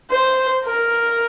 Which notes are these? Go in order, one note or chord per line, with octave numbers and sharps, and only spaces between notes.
C5
A#4